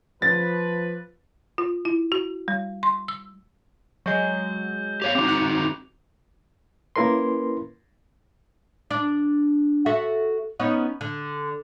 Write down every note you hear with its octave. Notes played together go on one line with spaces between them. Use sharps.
F3 B4 A6
F4
E4
F#4
G3
C6
E6
F#3 G#3 C#6 G6 G7
G4 C#5 F5 F7
C4 D#4 F#4 D6 G6
F#5
A#3 C#4 E4 A#4 B4 C6
D4
F#4 A4 E5
B3 C#4 D#4
D3